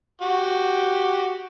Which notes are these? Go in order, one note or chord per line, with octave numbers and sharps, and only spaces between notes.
F#4 G4